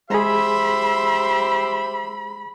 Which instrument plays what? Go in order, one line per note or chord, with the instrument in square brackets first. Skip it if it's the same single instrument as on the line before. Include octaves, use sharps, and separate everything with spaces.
[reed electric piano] G#3 G#4 [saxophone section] G4 C5 [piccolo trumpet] E5 [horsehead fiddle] B5